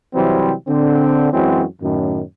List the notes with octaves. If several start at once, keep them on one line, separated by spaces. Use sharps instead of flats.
C3 E3 F#3 G3 C4
D3 C4
F#2 E3 F#3 G#3 C4 F#4
F#2 A2 D#3